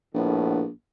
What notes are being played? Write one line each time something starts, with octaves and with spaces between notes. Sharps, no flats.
A#1 A2 D3 B3